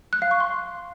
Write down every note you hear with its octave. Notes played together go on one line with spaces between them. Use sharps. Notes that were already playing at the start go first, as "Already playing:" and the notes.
F#6
F5
C#6
C6